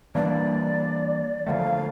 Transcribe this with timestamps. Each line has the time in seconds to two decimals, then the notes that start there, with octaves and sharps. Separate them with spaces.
0.15 E3 G3 A#3 D4 D5
1.47 D3 F3 A3 F5 G5